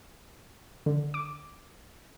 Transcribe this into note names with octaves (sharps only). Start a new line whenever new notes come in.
D3
D6